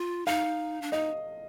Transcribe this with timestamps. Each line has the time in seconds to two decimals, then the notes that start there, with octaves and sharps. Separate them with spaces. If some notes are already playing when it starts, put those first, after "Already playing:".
Already playing: F4
0.26 D#4 F5
0.82 D4
0.92 D#4 D#5